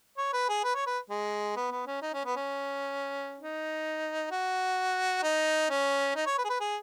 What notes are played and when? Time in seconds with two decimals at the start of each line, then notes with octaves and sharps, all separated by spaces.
0.18 C#5
0.33 B4
0.49 G#4
0.64 B4
0.75 C#5
0.87 B4
1.10 G#3
1.56 B3
1.72 B3
1.87 C#4
2.02 D#4
2.14 C#4
2.25 B3
2.36 C#4
3.40 D#4
4.31 F#4
5.23 D#4
5.70 C#4
6.16 D#4
6.26 C#5
6.38 B4
6.45 G#4
6.50 B4
6.60 G#4